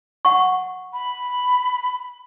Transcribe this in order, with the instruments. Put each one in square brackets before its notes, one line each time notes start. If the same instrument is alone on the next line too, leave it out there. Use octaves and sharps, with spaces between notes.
[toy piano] F#5 C#6
[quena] B5